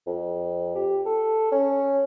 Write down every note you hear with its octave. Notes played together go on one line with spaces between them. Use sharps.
F2
G4
A4
C#4